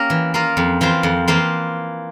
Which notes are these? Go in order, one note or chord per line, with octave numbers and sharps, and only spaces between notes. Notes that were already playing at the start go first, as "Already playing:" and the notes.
Already playing: A#3 C#4 G4 A#4
E3
A#3 F4 A#4
F2
E3 A#3 F4 C5
F2
E3 A#3 F4 C5